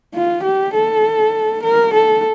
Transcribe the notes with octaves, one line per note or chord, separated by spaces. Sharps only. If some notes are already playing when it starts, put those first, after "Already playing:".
F4
G4
A4
A#4
A4